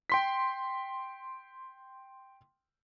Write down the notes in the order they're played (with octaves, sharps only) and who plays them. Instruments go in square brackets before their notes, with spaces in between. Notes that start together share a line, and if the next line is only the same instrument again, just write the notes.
[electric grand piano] G5 C6 B6